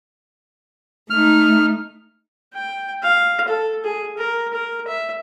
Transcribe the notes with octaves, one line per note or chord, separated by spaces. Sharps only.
A3 D#4 F6
G5
F5
A4
G#4
A#4
A#4
E5